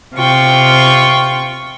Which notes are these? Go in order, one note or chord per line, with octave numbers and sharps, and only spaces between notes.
C3 F4 G5 C#6